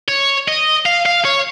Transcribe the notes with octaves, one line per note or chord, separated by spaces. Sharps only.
C#5
D#5
F5
F5
C#5